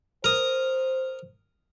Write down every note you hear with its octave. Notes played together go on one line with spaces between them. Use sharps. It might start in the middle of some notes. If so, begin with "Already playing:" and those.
A#4 C5 D#6